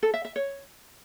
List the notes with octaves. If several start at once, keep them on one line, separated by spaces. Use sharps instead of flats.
A4
E5
E5
C#5